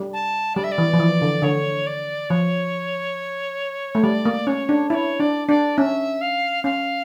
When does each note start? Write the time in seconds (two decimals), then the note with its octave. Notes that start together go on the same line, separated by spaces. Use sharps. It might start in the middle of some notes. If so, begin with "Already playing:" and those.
Already playing: G3
0.13 A5
0.56 G3 D5
0.64 E5
0.72 D5
0.78 E3
0.93 F3
0.99 E3
1.22 D3
1.42 D3 C#5
1.87 D5
2.30 F3 C#5
3.95 A3
4.03 G3 D5
4.26 A#3
4.47 C#4 C#5
4.69 D4
4.90 E4 D5
4.94 C#5
5.20 D4 D5
5.48 D4 D5
5.77 C#4 E5
6.21 F5
6.64 C#4 F5